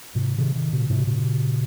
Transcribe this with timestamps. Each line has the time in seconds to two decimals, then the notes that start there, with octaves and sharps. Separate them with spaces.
0.15 G#2 C3
0.38 C3 D#3
0.55 C3 D#3
0.73 A#2 C#3
0.90 G#2 C3
1.07 A#2 C#3